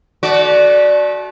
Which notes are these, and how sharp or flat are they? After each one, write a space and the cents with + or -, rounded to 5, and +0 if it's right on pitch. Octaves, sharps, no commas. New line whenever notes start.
A3 -30 F#4 +0 D5 +0